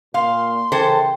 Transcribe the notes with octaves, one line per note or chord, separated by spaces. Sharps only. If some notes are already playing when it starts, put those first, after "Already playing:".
A#2 F5 C6
C#3 E3 A4 A#4 C5 G5